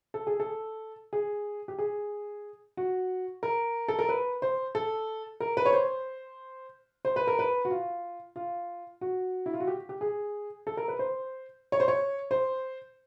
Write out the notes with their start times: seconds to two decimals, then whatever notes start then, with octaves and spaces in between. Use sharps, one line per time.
0.14 A4
0.27 G#4
0.40 A4
1.13 G#4
1.68 G4
1.79 G#4
2.77 F#4
3.43 A#4
3.88 A4
3.99 A#4
4.09 B4
4.42 C5
4.75 A4
5.40 A#4
5.57 B4
5.65 C#5
5.73 C5
7.05 C5
7.16 B4
7.27 A#4
7.39 B4
7.65 F#4
7.71 F4
8.36 F4
9.01 F#4
9.46 E4
9.53 F4
9.60 F#4
9.67 G4
9.89 G4
10.01 G#4
10.67 A4
10.77 A#4
10.88 B4
10.99 C5
11.72 C#5
11.80 C5
11.88 C#5
12.31 C5